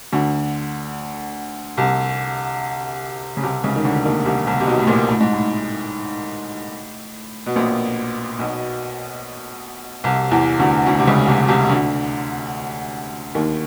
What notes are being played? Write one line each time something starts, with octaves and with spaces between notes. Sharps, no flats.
D2 D3
C2 C3
C#3
C2 C3
C#2 C#3
D#3
D2 D3
D#2 D#3
C2 C3
C2 C3
C3
B1 B2
A2
A#1 A#2
A2
G#2
A2
B2
A#1 A#2
B1 B2
C2 C3
E2 E3
D2 D3
D2 D3
C3
C#2 C#3
C2 C3
C2 C3
D2 D3
D#2 D#3